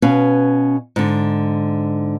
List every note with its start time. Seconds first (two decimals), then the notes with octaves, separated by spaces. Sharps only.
0.02 B2 C#4 B4 F5
0.96 G#2 D3